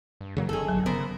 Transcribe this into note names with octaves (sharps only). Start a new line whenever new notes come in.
G2
F#2 C#3 F#3 A#3
G1 D#3 G#4 A4
A#1 F#3
C#3 B3 A#4 C5